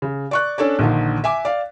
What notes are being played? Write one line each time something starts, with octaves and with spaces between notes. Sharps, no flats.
C#3
D5 C#6 F#6
C#4 D4 A4 C#5 D5
A#1 D3 D#3
E5 G#5 D6
D5 F5